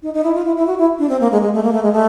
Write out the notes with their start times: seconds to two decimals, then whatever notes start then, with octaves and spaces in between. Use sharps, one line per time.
0.03 D#4
0.14 D#4
0.24 E4
0.35 F4
0.45 E4
0.56 E4
0.67 F#4
0.78 E4
0.99 D4
1.09 C4
1.20 A#3
1.32 G#3
1.42 G#3
1.53 A3
1.63 A#3
1.73 A3
1.83 G#3
1.93 A3